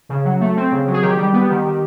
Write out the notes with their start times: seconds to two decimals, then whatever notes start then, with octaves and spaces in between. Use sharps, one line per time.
0.09 C#3
0.25 F#3
0.40 A3
0.56 C4
0.71 C#3
0.87 F#3
0.93 G#4
1.02 D#3 G4
1.18 G3
1.33 B3
1.49 D#3
1.65 D#3